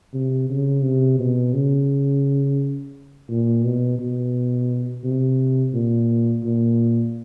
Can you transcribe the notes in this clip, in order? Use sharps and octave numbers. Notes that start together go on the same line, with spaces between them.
C3
C#3
C3
B2
C#3
A#2
B2
B2
C3
A#2
A#2